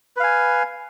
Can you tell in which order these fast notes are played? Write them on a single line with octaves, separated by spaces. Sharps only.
B4 F5 G#5